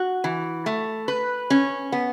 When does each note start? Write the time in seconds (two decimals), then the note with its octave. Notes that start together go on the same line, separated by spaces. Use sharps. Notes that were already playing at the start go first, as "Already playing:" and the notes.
Already playing: F#4
0.24 E3
0.66 A3
1.08 B4
1.50 C#4
1.92 B3